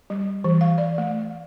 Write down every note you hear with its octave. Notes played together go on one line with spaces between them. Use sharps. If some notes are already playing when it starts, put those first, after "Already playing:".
G3
E3
F5
D5
A3